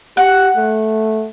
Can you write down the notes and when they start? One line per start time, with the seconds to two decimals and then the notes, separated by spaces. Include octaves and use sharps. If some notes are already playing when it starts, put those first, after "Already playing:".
0.17 G4 F#5
0.56 A3